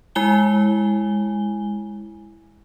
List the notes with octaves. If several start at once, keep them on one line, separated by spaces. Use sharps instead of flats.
G#3 E4 G#5 G7